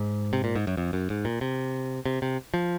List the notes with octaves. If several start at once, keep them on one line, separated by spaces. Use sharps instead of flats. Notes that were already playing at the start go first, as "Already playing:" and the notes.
Already playing: G#2
C3
A#2
G#2
F#2
F2
F#2
G#2
A#2
C3
C3
C3
F3